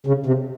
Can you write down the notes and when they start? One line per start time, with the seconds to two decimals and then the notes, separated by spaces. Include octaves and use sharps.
0.06 C#3
0.26 C3